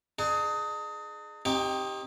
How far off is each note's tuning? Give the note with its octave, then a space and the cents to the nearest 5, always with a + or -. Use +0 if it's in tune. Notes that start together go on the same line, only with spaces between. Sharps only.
D4 +45 G#4 +15
C4 +40 D#4 +0 G4 +0